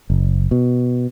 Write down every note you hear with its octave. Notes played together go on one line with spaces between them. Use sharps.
F#1
B2